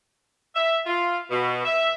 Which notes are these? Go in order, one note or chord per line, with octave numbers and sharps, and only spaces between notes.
E5
F4
B2
E5